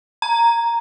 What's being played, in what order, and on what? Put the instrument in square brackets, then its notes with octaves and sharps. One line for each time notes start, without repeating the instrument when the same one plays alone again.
[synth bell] A#5